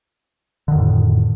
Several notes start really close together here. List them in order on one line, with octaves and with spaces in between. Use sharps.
D3 D#3 F2 A2